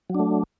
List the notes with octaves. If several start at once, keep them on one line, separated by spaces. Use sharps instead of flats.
F#3 A3 D4